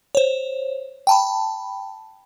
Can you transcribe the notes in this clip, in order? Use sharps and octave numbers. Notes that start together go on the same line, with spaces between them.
C5 C#5
G5 A5 B5